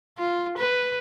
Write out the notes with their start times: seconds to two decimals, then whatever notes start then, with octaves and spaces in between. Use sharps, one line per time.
0.19 F4
0.58 B4